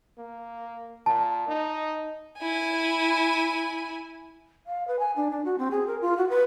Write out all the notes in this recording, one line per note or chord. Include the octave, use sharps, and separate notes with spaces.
A#3
A#2 A5
D#4
E4 G#5
F5
B4
G#5
D4
D4
F#4
C4
G#4
A#4
F4
F#4
B4